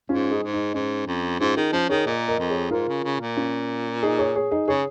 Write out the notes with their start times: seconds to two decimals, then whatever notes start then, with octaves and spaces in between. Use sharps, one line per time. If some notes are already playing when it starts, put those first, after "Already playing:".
0.09 G#2 C#4 F4
0.31 D#4 G#4
0.43 G#2
0.53 D#4
0.74 G#2 C#4
1.07 F2
1.40 G#2 C#4 F4
1.57 D#3 D#4 G#4
1.73 F3 C#4
1.89 D#3 G#4 C#5
2.06 A#2 A#4 D#5
2.28 A#4 D#5
2.39 F2
2.50 G#4 C#5
2.71 G#2 F4 A#4
2.88 C#3
3.04 C#3
3.20 A#2
3.37 C#4 F4
4.02 D#4 G#4
4.19 G#4 C#5
4.35 G#4 C#5
4.51 D#4 G#4
4.68 C#3 G#4 C#5